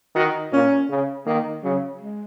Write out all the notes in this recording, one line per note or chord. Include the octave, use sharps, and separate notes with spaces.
D#3 F#4
A#2 C#4
C#3
D#3 A#3
C#3 F#3
G#3